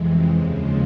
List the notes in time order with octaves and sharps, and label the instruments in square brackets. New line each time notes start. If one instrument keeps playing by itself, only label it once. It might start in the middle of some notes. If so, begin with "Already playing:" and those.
Already playing: [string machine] F2 C3 E3 G#3
D#2 C#3 F3 G#3